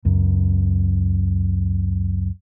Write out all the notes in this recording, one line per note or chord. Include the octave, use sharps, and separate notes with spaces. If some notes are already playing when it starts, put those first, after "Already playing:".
C#2 F#2